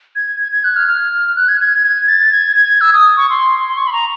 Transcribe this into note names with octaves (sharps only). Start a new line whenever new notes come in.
G#6
G#6
G#6
F#6
F6
F6
F#6
G#6
G#6
G#6
A6
G#6
G#6
E6
D#6
C#6
C6
C6
C#6
B5
A#5